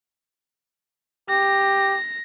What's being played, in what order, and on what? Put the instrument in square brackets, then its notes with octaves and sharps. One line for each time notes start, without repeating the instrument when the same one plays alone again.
[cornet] G4 [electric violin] A#6